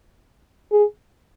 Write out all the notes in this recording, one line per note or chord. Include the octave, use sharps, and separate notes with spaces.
G#4